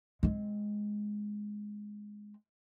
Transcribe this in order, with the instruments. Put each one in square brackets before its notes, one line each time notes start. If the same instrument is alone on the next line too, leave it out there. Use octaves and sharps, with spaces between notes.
[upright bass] G#3 C4